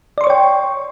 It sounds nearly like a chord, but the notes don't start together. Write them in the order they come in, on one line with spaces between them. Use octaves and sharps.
D5 C6 C#6 C#5 G5